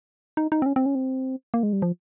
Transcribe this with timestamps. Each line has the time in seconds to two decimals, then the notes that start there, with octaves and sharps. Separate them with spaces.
0.37 D#4
0.52 D#4
0.62 C4
0.66 C#4
0.76 C4
0.86 C#4
0.95 C4
1.54 A#3
1.63 G#3
1.73 G3
1.82 F3